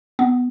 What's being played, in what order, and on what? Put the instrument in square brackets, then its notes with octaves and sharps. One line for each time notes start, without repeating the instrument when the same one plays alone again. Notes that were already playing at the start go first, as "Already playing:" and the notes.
[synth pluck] B3